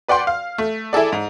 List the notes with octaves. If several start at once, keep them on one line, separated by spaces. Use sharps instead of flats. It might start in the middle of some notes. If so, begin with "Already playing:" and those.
B4 D5 F#5 G5 C6
F5
A3
E4 G#4 A4 D5
G#2